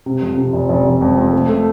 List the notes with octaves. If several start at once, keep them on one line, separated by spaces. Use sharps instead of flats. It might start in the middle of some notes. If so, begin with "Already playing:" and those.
C3
F2
C3
F1
F1
F1
F2
F2
A3
A3